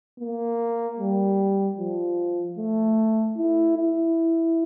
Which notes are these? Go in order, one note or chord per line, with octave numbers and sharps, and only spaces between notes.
A#3
G3
F3
A3
E4
E4